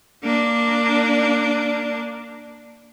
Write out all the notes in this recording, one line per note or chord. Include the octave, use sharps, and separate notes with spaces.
A#3 D4